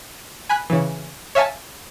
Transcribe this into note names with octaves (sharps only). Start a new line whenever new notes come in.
G#5 B5 F#6
C#3 E3
C#5 E5 F5 G#5 A5